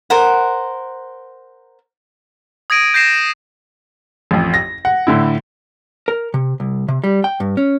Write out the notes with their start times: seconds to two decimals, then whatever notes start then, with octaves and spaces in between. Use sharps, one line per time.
0.10 A#4 C5 F#5
2.70 D#6 G#6 A#6 D7 D#7
2.94 G6 A#6 C7 E7
4.31 A1 F2
4.54 A#6
4.85 F#5
5.07 A2 D3 E4
6.08 A#4
6.34 C3
6.60 C2
6.89 C3
7.04 G3
7.24 G5
7.40 G2
7.57 C#4